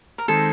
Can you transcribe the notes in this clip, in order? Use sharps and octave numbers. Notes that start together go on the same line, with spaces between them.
A#4
D#3 G#3 C4 A4